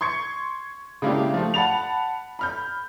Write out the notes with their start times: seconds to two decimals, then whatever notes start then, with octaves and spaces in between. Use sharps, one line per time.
0.01 C6 C#6 G#6 C#7
1.02 C#3 G#3 A#3 D4 E4 G4
1.34 F3 A3
1.54 F#5 A5 B5 A6 F7
2.39 B5 F6 G6